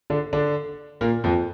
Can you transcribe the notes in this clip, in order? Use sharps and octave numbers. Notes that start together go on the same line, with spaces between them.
D3 D4
D3 D4
A#2 A#3
F2 F3